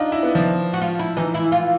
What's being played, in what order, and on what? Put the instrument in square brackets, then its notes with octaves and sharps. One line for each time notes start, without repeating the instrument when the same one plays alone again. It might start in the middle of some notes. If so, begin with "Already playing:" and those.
Already playing: [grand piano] D4 D#4 [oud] F4
[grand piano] E4
B3
F3
[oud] F#4
F4
E4
[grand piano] E3 [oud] D#4
[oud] E4
F4